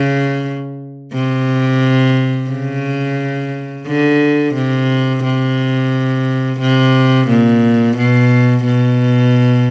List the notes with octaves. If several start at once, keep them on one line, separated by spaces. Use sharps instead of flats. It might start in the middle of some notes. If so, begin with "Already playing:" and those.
Already playing: C#3
C3
C#3
D3
C3
C3
C3
A#2
B2
B2